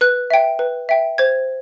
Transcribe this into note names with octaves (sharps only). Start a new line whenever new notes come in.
B4 F#6
E5 G5
B4
E5 G5
C5 G#6